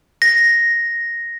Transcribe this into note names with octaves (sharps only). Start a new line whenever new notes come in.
A#6